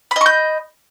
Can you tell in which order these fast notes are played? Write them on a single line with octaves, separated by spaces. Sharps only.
B5 D#5 C#6 G6